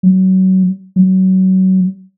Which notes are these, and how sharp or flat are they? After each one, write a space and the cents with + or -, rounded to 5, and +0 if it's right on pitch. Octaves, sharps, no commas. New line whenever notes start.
F#3 +25
F#3 +25